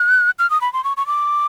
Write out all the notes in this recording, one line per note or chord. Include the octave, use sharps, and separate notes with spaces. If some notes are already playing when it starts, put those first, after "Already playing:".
Already playing: F#6
F6
D#6
B5
C6
C#6
C#6
D6